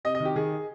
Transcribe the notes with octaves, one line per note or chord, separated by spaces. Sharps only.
C3 D#5
D#5
D#3
G4
D#3 G#4